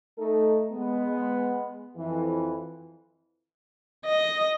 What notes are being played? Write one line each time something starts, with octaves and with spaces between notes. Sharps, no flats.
A3 D#4 A4
G#3 B3
F2 E3
D#5